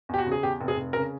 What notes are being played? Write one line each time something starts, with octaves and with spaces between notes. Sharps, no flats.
E2 G4
F#4
C#3
G#4
E2 G4
F1
G#4
F1
C#3 A#4